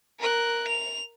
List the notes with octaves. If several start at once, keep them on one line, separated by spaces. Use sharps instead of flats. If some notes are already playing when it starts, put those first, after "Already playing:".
A#4 F#6
F7